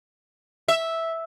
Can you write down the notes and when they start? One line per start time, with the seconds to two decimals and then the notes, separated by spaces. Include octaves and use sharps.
0.68 E5